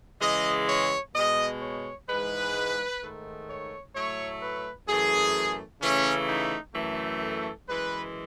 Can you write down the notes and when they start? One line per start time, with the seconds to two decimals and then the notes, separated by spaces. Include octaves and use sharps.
0.21 C#3 E3 G#3 D#5
0.67 C#5
1.15 B2 G#3 D#5
1.62 C#5
2.08 G#2 E3 G#3 B4
3.01 G#2 D#3 A3
3.49 C#5
3.94 A2 F#3 A3 C#5
4.42 B4
4.88 F#2 E3 A3 G#4
5.82 C#3 E3 A3 C#4
6.28 D#4
6.75 F#2 E3 A3
7.21 A4
7.68 F#2 E3 G#3 B4